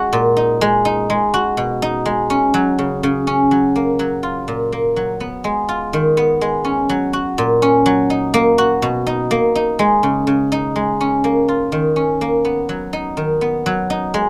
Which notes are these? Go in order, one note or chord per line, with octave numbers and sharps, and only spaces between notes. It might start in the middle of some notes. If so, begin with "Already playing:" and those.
Already playing: G#3 F#4
A#2
D#4
G#3
D#4
G#3
F#4
B2
D#4
G#3
C#4
F#3
C#3
C#3
C#4
F#3
A#3
F#3
F4
A#2
A#3
F#3
B3
G#3
F4
D#3
B3
G#3
C#4
F#3
F#4
A#2
C#4
F#3
D#4
A#3
F#4
B2
D#4
A#3
D#4
G#3
C#3
C#3
D#4
G#3
C#4
A#3
F4
D#3
C#4
A#3
B3
F#3
D#4
D#3
B3
F#3
D#4
G#3